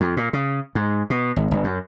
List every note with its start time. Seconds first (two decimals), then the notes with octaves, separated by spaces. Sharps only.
0.01 F2
0.17 A#2
0.33 C#3
0.75 G#2
1.10 B2
1.36 G#1
1.51 G1
1.64 F#2